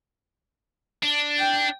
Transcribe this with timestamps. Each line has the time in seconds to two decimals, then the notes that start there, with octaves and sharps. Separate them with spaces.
1.04 D4
1.39 G5